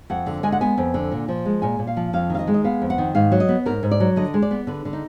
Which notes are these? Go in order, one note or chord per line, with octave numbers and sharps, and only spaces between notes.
F2 F#5
D3
G#3 G#5
F#5
B3 G#5
F2
D3
A#2
F3
G#3
A#2 G#5
A#2
F5
F3
F2 F5
D#3 F5
D#5
G#3
D#5
B3 F5
F2
F#5
D#3
G#2 F5
F#3
D#5
B3
G#2 A#4
G#2
D5
F#3
D3 D#5
G#3
D5
B3
D3 B4
D3
D#4